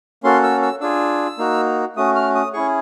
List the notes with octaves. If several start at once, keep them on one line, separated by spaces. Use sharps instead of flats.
A#3 C#4 F#4 A4 C6
E6
E6
D4 F4 G#4 E6
A#3 D#4 F#4
A3 C#4 F#4 D#6
F6
D#6
C#4 E4 G#4 C#6